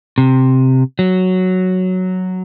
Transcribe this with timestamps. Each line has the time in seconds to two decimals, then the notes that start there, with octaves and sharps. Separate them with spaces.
0.18 C3
0.99 F#3